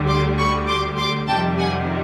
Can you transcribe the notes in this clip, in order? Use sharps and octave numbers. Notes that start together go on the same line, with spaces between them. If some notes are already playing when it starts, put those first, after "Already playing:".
Already playing: D2 D3 G3
C6 D6
B5 C#6
C6 D6
C6 D6
F2 C3 D#3 G3 G5 A5
F#5 G#5